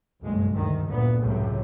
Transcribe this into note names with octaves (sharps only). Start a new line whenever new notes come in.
F#1 B1 G2 G#3
D2 D#3
D2 A#2 B3
C#2 F#2 A2 C3